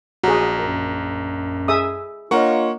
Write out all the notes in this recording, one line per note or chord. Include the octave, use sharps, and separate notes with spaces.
A#1 F#4 G#4 A#5
F#2 A#4
G#4 E5 D#6
A#3 D4 F4 A#4 C#5 D#5 F#5 C#6